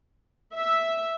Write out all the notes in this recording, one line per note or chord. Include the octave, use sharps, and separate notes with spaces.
E5